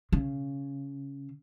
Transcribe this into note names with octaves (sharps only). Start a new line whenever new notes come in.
C#3